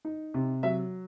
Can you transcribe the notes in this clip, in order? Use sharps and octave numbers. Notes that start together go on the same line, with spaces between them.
D#4
C3
F#3 E5